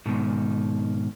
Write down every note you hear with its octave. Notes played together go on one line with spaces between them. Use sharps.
G#2 B2 D#3